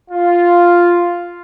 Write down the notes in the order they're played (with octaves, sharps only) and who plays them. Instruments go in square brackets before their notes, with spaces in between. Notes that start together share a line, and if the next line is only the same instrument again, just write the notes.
[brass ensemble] F4